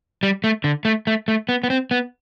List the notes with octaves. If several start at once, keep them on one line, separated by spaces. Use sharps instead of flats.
G3
A3
D3
A3
A3
A3
B3
B3
C4
B3